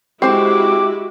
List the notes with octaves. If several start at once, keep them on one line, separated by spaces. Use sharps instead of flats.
G#3 C4 E4 F#4 G4 C5 G5 D6